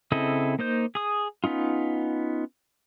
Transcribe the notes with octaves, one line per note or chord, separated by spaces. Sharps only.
C#3 C4 E4 A4 D#5
A#3 D#4 C5 G6
G#4 D#6
B3 C#4 D#4 F4